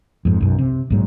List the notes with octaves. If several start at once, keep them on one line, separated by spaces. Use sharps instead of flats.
F2 G#2
B1 F#2
C3
A#1 G#2 F#3